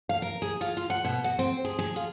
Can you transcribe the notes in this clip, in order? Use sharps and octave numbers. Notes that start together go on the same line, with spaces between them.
F5
A#4
G#4
F4
F4
F#5
B2
F#4
C4
G#4
G#4
F4